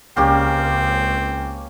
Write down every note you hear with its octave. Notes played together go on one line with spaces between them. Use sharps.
C#2 A#3 C4 C#4 G4